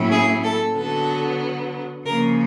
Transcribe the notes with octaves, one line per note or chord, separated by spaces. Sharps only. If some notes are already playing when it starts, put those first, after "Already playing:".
Already playing: A2 F#3 A#3 C#4 E4
G#4
A4
D3 F#3 B3 A4
C#3 F3 A#3 C#4 A#4